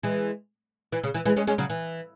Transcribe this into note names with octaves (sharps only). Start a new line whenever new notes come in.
E3 G#3
E3
C#3
E3
E3 G#3
G#3 C#4
G#3 C#4
C#3 F#3
E3